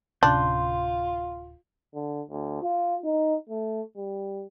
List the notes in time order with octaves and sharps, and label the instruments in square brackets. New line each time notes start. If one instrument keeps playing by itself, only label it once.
[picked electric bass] D1 C3 C#4 [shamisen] D4 [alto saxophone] F4 [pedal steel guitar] C6 G6
[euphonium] D3
D2
F4
D#4
A3
G3